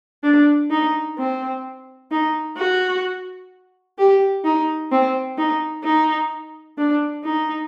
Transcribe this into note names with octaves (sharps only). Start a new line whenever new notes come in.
D4
D#4
C4
D#4
F#4
G4
D#4
C4
D#4
D#4
D4
D#4